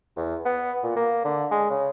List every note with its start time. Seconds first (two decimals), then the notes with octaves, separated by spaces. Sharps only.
0.16 E2
0.45 B3
0.83 A#2
0.96 A#3
1.25 D3
1.51 G#3
1.70 C#3